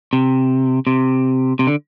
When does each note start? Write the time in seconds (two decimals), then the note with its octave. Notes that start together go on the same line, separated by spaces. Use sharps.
0.13 C3
0.87 C3
1.59 C3
1.67 D3